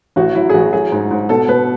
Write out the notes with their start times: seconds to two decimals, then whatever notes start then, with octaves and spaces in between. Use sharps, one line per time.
0.16 A1 F#4
0.35 F#3 E4
0.49 G#4
0.54 A1 F#4
0.72 F#3 G#4
0.92 G#2
1.11 G#2
1.29 B2 A4
1.48 B2 B4